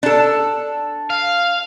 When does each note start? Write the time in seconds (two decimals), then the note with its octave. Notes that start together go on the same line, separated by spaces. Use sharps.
0.03 D4 A4
1.10 F5